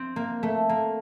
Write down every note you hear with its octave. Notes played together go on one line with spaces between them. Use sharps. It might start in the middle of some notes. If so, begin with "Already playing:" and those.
Already playing: C4
A#3
A3
A#3